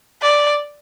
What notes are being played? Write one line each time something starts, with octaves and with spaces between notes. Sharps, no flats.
D5